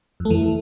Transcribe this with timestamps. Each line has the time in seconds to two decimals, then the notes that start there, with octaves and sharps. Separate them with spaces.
0.20 F2
0.25 A3
0.30 E3